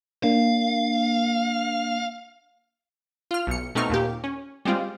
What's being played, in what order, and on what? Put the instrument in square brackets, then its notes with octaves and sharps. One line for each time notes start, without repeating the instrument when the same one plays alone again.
[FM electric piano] A#3 D4 [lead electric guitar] F5
[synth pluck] F4 F6
B1 C#7
B2 A3 C4 D#4 C#6 F6
D#2 A#2 G4
C#4
G3 G#3 C4 F4